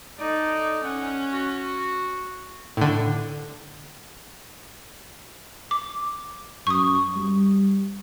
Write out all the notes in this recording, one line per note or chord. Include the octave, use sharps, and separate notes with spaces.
D#4 A4 D5
C#4 F#5
F#4
A2 D3
D6
F#2 C#6 D#6
G3